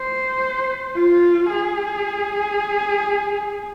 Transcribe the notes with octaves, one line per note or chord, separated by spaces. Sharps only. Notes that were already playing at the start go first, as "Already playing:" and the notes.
Already playing: C5
F4
G#4